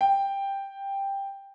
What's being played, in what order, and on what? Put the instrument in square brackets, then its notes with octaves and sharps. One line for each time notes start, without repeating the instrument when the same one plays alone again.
[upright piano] G5